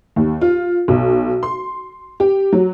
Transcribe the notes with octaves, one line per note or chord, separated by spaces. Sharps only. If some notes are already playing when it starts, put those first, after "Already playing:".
D#2
F4
B1
C6
G4
F#3